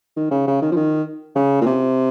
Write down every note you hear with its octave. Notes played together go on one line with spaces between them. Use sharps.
D#3
C#3
C#3
D#3
F3
D#3
C#3
A#2
C3